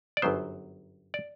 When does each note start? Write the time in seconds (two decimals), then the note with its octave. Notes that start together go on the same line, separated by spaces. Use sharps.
0.17 D5
0.22 G1 F#2 F#3 B3 C5
1.14 D5